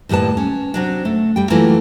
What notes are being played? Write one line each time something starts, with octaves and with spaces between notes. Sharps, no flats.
D#2 A2 G3 B4 A5
C#4
C3 F#3 D4
A3
G3 G5
E3 F#3 A3 A#3 E4 F4